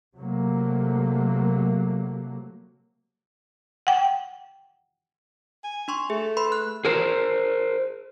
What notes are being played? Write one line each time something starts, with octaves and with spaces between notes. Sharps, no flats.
C3 F#3 A3 A#3
F#5 G5
G#5
D4 C6 C#6
A3 G#4
B4 B5 C6
F#6
G#4 A#4 C5